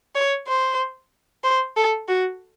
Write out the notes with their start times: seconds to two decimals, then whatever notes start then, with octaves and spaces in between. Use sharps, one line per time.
0.15 C#5
0.48 C5
1.44 C5
1.77 A4
2.08 F#4